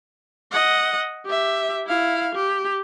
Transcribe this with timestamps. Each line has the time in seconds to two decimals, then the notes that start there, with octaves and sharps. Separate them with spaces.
0.51 D#5 F#5
1.26 G4 E5
1.86 E4 F5
2.35 G4